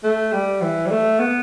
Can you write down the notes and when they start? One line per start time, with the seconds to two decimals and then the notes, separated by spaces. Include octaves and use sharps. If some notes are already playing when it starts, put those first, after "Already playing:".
0.03 A3
0.33 G3
0.61 E3
0.86 G3
0.91 A3
1.19 B3